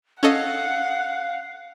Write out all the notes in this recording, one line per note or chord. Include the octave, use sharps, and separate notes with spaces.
C#4 A4 D#5 F5 F#5